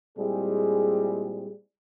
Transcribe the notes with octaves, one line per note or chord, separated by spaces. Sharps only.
A#2 G3 G#3 C4 E4 G#4